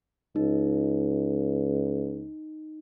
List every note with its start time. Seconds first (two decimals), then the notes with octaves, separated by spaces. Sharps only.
0.36 C#2 D#4